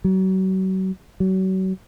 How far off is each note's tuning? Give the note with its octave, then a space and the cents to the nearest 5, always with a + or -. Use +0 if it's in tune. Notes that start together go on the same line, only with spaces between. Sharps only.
F#3 +35
F#3 +35